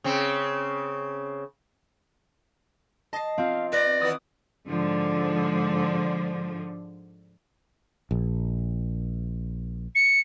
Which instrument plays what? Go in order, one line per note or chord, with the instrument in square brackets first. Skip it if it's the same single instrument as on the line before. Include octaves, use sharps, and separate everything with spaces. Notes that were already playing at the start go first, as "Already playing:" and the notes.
[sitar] C#3 C4
[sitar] D#5 [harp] A5 C7
[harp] C4 F4 [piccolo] F5
[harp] B4 [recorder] D5 [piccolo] A#6
[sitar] D#3 E3 B3 [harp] D#6 A6
[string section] G#2 D3 F3
[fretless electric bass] A#1
[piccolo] C#7